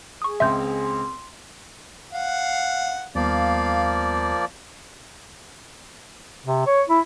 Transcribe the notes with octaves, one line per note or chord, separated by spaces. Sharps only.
G#4 C#6 D#6
C#2 G#3 C4 E5 C6 G6
F5 F#5
D#2 F3 G3 A#3 B3 D5 F5
C3
C#5
E4